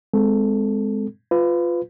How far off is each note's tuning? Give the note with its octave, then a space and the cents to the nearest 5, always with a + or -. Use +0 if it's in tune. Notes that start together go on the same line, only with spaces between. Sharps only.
G#3 +0 C4 -25 A4 +0
F4 +0 B4 +25